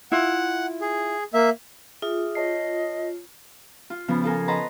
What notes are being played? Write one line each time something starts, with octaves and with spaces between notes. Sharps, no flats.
E4 F4 F#5
G#4
A#3 E5
F4 G#4 E5 D#6
C#5 D#5 A5 C7
F4
C#3 F3 B3
F4 A4 A#4 G#5
B4 D#5 F#5 A5 A#5 C6